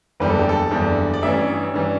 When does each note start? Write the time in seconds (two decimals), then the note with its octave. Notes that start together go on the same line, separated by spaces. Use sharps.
0.20 F#1 E2 D3 G3 B4
0.29 A4
0.39 G4
0.49 A4
0.71 F#1 E2 D3 G3
1.14 D5
1.22 A1 G2 E3 G3 C#4 E5
1.74 G2 E3 G3 C#4